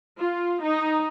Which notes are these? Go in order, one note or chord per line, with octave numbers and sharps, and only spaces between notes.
F4
D#4